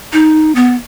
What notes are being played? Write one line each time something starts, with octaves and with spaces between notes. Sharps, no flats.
D#4
B3